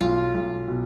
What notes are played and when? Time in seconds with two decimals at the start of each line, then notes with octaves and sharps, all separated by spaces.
0.01 B1 F4
0.34 B1
0.68 B2